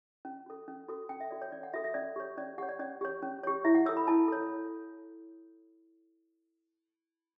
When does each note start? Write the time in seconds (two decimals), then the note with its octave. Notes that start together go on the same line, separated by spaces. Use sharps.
0.25 C#4
0.46 F#4 A4
0.68 C#4
0.88 F#4 A4
1.09 C#4 G5
1.20 E5
1.31 F#4 A4 D5
1.42 C#5
1.52 C#4 D5
1.63 F#5
1.73 F#4 A4 E5
1.84 E5
1.94 C#4 D5
2.16 G4 C#5
2.37 C#4 D5
2.58 G4 C#5 F#5
2.69 D5
2.79 C#4 D5
3.01 G4 C#5
3.22 C#4
3.44 G4 C#5
3.65 E4 E5
3.75 F#5
3.86 A4 C#5 E6
3.97 B5
4.07 E4 A5
4.28 A4 C#5